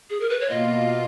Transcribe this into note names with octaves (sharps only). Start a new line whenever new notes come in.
G#4
A#4
B4
C#5
B2 A#3 F4 D#5